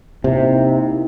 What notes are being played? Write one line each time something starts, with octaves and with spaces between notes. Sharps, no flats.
C3 A#3 D#4 E4